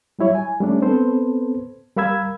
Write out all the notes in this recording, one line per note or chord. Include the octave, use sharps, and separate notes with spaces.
F#3 G3 E4 C#5 E5
G#5
G3 A3 C#4 D4
B3 C4 A4 B4 C5
G3 A#4 F5 B5 E6 G#6